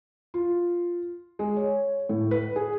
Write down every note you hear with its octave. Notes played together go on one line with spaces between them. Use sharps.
F4
G#3
C#5
A2
B4
G#4